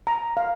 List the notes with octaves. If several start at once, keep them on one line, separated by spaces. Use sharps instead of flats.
A#5
F5